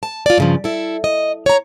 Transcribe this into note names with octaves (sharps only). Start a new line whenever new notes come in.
A5
F4 D5
G2 C#3 F3
E4 A4
D#5
C#5 A#5